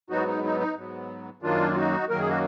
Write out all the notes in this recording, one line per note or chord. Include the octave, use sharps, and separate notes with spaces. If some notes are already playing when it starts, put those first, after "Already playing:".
G#2 F#3 B3 D#4 F#4
D#4
D#4
D#4
G#2 F#3 B3
F#2 D#3 F#3 A#3 D4 F4
F4
D#4 F#4
F#2 D#3 F#3 A#3 A#4
G#4
F#4